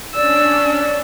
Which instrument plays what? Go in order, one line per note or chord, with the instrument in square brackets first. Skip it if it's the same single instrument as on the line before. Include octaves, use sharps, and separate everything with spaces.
[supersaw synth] C#4 D4 [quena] D5 [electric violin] E6